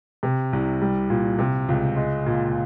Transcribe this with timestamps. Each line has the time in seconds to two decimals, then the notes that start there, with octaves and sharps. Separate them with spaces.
0.23 C3
0.53 C2
0.81 G3
1.10 A#2
1.39 C3
1.69 C#2
1.96 G#3
2.26 A#2